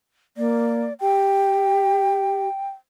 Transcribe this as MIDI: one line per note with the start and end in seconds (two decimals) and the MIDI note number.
0.37 0.85 58
0.37 0.93 74
1.01 2.48 67
1.01 2.68 79